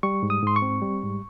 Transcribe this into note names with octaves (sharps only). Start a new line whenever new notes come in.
G3 C#6
G#2
D#6
G#2 C6
C#6
C4
G3
G#2